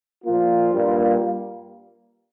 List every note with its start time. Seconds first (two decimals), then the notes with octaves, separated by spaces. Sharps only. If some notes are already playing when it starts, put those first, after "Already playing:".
0.25 A#2 F3 A#3 F4
0.71 G2 G3 A#3